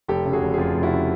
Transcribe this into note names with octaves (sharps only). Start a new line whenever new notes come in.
F1 G4 A4
C#3
F#4 G#4
F1
G#4
F2 F4 G4
F1
E4 F#4
C#3